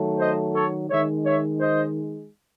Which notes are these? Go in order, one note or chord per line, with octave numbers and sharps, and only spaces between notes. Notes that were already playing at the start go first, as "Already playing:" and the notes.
Already playing: D#3 F#3 A3
C5 D#5
A4 C#5
D#3 G#3 C#5 E5
C#5 E5
C5 D#5